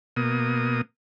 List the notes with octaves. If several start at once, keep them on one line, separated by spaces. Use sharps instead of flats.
B2 A#3 D#6